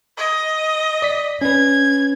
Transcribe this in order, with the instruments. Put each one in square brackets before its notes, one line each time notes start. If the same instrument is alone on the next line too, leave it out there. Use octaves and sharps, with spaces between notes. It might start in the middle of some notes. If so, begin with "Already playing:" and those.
[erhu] D#5
[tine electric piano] D5 B6
[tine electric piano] C#4 B4 [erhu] G#6